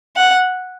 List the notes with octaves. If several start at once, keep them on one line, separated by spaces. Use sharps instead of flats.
F#5